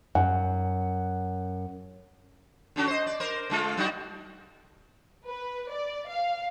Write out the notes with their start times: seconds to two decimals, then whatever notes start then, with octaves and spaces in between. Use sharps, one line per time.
0.15 F#2 F#5
2.76 D3 C#4 F#4
2.87 C5 D#5
3.06 D5
3.20 A#4 C5
3.50 D3 G#3 F4
3.77 F#3 D#4 F#4
5.27 B4
5.70 D5
6.08 F5